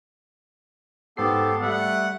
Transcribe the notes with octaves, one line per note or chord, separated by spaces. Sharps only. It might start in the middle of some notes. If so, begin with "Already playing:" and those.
G#2 B3 G4 A4 C5 C7
G3 A3 E5 F#5